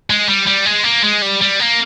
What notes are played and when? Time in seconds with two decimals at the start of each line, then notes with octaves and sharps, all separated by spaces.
0.10 G#3
0.29 G3
0.47 G3
0.66 G#3
0.84 A#3
1.04 G#3
1.22 G3
1.41 G3
1.60 A#3